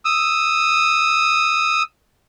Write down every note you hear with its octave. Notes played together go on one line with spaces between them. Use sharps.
D#6 E6